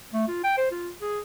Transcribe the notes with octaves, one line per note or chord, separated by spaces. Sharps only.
A3
F4
G5
C5
F4
G#4